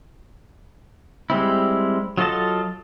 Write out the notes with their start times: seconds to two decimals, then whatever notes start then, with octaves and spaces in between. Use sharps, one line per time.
1.30 G3 G#3 C4 E4
2.17 F#3 F4 A4 D#5 A5